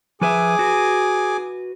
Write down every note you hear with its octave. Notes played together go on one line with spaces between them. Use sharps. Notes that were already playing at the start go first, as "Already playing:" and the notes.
F3 G#4 B4 E5 G#5 D6
F#4 B4